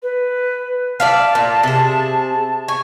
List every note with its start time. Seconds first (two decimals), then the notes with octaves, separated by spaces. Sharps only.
0.02 B4
1.00 D5 E5 F5 A5
1.35 A#2
1.63 C3 G#4
2.68 G#5 C#6